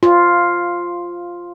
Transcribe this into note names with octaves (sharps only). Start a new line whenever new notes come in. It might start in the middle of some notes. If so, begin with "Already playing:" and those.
F4